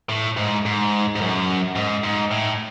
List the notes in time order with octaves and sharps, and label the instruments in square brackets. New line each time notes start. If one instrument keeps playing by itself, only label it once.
[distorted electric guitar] A2
G#2
G#2
G#2
F#2
G#2
G#2
A2